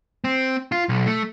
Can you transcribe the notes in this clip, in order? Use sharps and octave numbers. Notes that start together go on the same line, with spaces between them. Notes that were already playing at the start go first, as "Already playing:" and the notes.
C4
F4
B1
A3